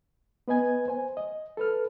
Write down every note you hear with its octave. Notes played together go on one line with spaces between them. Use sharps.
B3 B4 D#5 G#5 G#6
C5 G#5
D#5
A4 B4 F6